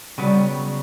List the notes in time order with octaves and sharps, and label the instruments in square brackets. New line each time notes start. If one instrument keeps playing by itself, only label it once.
[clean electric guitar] C#3 F#3 B3 [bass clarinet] G3